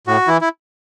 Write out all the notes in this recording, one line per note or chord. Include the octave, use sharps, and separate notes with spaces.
A2 F#4
E3 E4
E4